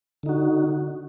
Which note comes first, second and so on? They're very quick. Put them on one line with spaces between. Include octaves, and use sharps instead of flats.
D3 D#4 F#4